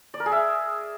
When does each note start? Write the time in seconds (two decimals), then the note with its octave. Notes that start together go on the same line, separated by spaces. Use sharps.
0.14 D5
0.20 A#4
0.26 G#4
0.32 E5